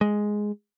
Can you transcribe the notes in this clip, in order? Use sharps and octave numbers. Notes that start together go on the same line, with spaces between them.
G#3